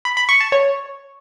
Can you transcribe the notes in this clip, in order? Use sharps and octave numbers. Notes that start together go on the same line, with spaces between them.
B5
B5
C#6
A5
C#5